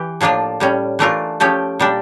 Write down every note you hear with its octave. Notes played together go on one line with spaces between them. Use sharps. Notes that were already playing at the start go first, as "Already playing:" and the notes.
Already playing: E3 G4
A2 F3 A#3 D4 F4
A2 G3 C#4
E3 A3 D4 F4 A#4
F3 A3 C#4 G4
A#2 G3 D4